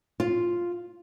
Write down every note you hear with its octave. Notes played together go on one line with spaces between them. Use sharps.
F4